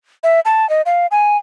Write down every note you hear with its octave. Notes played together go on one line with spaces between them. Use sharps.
E5
A5
D#5
F5
G#5